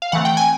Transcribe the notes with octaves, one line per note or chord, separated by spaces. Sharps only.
F5
E3 A3 C4 F#5
G5
G#5